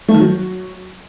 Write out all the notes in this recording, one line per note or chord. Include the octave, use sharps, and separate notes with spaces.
A3
D#3
F#3